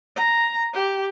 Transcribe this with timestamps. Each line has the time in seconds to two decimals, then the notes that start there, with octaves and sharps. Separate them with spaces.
0.16 A#5
0.74 G4